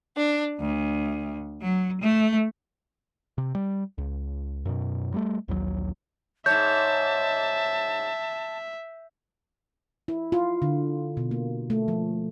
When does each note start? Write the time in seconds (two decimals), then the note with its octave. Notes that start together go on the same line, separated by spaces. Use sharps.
0.17 D4
0.59 D2
1.61 F#3
2.01 A3
3.38 C3
3.55 G3
3.98 C#2
4.66 F#2 B2
5.14 G3 A3
5.48 A#1 D#2 F#3
6.46 G#2 C#5 E5 A5 G6
10.08 E4
10.32 F4
10.62 D3
11.17 B2
11.31 A#3
11.70 A3
11.88 F3